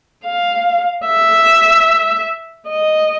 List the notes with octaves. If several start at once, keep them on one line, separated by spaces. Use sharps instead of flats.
F5
E5
D#5